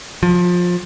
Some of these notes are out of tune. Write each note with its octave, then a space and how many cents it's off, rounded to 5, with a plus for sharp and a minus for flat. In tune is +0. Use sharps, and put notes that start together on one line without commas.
F3 +20